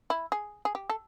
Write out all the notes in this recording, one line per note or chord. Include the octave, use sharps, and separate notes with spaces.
E4
G#4
G#4
G4
A4